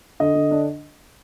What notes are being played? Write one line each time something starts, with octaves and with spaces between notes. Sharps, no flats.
D3 D#5
D3
D4